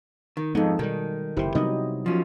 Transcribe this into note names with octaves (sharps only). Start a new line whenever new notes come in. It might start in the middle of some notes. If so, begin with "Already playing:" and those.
D#3
F2 G#2 G#3 B3 D#4 A4
B2 D#3 G3
F#1 C3 E4 G4 C5
C3 F#3 G3 B3 D#4 D#5
F3 F#3 C#4